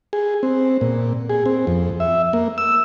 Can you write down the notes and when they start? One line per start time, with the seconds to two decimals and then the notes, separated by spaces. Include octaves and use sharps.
0.13 G#4
0.43 C4
0.81 A#2
1.29 G#4
1.46 C4
1.67 F2
2.00 E5
2.33 A#3
2.58 E6